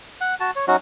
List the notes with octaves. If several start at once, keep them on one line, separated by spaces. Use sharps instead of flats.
F#5
F#4 A5
C#5
F#3 C#4 D#4 F#4